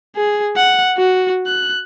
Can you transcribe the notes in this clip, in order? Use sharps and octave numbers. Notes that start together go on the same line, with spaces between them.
G#4
F#5
F#4
F#6